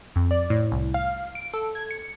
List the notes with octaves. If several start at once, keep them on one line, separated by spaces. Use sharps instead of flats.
F2
D5
A2
C2
F5
D7
A4
G#6
C#7